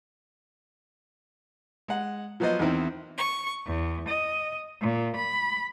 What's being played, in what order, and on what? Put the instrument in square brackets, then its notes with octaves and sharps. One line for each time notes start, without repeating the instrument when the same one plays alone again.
[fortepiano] G#3 F#5
F3 F#3 B3 F4 C5 D#5
E2 D#3 E3 C4 E4
[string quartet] C#6
E2
D#5
A#2
B5